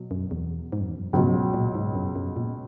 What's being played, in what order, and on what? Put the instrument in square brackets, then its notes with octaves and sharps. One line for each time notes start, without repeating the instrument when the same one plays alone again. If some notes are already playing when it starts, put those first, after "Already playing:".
Already playing: [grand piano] B2 F#3
[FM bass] F#2
E2
G#2
F#2
E2
F#2
[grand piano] C#2 B2 F#3 [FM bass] G#2
[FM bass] A#2
G#2
F#2
F#2
A#2